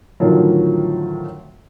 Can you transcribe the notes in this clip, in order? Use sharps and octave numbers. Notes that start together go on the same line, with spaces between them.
A2 D3 D#3 F3 F#3